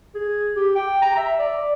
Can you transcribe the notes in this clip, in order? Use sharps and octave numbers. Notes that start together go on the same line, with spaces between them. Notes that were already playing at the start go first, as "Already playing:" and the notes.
G#4
G4
G5
A#5
E5
D5